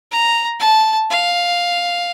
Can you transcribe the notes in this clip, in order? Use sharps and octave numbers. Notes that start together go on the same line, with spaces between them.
A#5
A5
F5